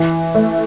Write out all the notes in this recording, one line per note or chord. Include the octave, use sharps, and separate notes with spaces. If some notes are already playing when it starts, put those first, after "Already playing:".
Already playing: E3
A3